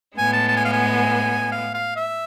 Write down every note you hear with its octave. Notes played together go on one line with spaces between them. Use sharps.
A2 G#3 B3 G#5
A5
A5
G#5
F5
G#5
F5
F5
E5